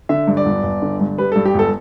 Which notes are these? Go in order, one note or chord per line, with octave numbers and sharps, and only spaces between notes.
D3 E5
G2
D5
G1
G1
D3
G2
G3 B4
G2 A4
G4
G1 A4